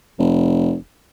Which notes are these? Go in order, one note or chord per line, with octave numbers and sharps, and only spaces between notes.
F1